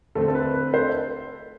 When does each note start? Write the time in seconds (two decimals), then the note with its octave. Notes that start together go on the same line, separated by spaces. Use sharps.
0.15 D3 A3 C4 A4
0.28 A4
0.35 B4
0.54 B4
0.73 A4 C5